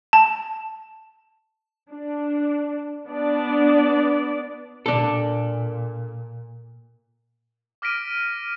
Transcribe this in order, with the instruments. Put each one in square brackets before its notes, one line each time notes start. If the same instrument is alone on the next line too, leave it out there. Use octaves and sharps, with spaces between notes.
[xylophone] A5
[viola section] D4
B3 D4 D5
[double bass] A#2 [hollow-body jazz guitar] D4 A4
[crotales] D6 F6 A#6 B6 D7 D#7